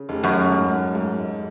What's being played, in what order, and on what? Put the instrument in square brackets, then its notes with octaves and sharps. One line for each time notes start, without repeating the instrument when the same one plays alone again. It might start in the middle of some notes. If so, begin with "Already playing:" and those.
Already playing: [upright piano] C#3
F1
[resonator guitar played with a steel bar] F#2
[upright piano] G#2
G#2